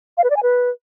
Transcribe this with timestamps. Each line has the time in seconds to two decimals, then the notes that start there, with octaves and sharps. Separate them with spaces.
0.18 F5
0.24 B4
0.30 D5
0.36 G#5
0.43 B4